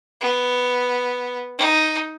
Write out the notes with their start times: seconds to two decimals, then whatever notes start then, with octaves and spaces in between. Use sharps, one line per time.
0.21 B3
1.58 D#4